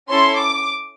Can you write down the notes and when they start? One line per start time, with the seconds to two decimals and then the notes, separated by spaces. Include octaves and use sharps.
0.09 C#4 E4 A4 C6
0.38 D6